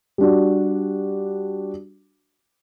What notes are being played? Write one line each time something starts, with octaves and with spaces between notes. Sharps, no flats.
G3 D4 F#4